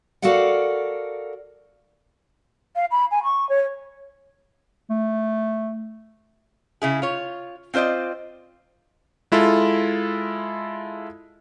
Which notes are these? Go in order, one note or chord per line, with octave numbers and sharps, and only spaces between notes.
F#4 A4 A#4 D5 F5 F#5
F5
B5
G#5
C#6
C#5
A3
C#3 E4 G#4
F4 C#5
C4 F4 C5 D5 D#5
G#3 E4 F4 A4